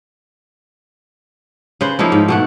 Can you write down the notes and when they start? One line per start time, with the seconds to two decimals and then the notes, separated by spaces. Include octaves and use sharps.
1.81 C#3 B4 C5
1.99 F3 A#3 D#4 E4
2.12 G#2
2.28 B2 A3 F#5